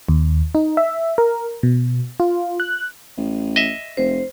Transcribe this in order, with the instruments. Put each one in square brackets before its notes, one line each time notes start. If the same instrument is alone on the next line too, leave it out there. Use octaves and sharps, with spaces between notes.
[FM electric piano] D#2
D#4
E5
A#4
B2
F4
F#6
[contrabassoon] A1
[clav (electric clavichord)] D#5 E5
[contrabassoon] F1 [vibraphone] C5